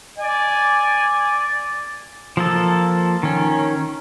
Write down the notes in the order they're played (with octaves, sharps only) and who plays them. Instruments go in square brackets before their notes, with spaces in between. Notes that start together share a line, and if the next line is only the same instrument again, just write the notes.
[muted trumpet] D5 [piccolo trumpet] G#5
[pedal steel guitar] F3 A#3 A4
D#3 C#4